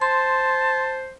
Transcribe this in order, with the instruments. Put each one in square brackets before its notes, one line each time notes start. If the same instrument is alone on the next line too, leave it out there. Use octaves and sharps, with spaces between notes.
[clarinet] C5 [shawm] A5 [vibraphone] C6